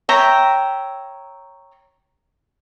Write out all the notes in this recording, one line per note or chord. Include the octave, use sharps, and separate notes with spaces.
C#5 E5 G5 A#5